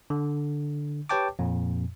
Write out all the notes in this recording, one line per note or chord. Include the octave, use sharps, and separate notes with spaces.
D3
G4 B4 C#5 G5 A5 D6
F2 A#2